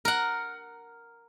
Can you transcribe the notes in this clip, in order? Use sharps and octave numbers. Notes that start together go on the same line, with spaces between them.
A#4 F#5